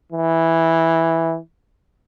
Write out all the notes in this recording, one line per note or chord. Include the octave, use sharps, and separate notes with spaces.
E3